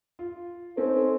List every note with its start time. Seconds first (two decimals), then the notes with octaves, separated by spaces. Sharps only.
0.19 F4
0.77 C4 C#4 D#4 A4 C5